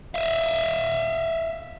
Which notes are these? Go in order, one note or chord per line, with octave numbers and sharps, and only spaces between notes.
E5 F5